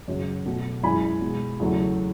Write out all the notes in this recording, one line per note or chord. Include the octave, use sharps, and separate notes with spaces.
F#2 C#3 F#3
B2 A3
F#2 E3 G#3 G#5 B5
B2 G#3
E2 C#3 F#3 A3